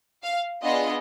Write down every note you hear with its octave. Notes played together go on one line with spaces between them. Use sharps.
F5
B3 D4 F4 G#4 D#5